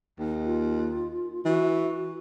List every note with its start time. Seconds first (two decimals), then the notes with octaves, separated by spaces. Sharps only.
0.19 D#2
0.46 F4
1.45 E3 F#4